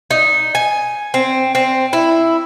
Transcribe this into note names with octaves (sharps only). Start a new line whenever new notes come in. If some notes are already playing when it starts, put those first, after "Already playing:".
D#4
G#5
C4
C4
E4